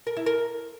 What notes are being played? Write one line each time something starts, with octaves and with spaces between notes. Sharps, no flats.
A#4
E4
A#4